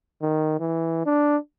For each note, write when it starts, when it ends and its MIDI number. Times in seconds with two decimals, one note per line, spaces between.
0.22 0.58 51
0.60 1.06 52
1.06 1.37 62